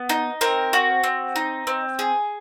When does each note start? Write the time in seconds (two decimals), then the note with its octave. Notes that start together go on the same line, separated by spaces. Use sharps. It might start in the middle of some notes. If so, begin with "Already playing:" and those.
Already playing: B3
0.09 D#4
0.41 C4 A#4
0.73 F#4
1.04 C4
1.36 D#4
1.67 C4
1.99 G#4